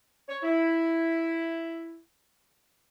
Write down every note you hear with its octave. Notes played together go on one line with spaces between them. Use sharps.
C#5
E4